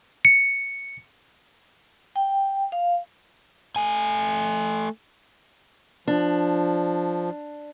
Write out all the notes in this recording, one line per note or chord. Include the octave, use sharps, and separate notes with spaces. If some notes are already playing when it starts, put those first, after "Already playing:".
C#7
G5
F5
A3 G#5
F3 D4